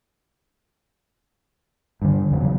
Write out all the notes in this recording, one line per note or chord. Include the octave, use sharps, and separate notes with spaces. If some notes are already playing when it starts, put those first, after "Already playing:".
G2 D3
E2 C#3 F#3